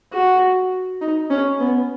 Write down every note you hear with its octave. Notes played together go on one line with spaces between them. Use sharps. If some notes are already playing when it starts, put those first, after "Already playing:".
F#4
D#4
C#4
B3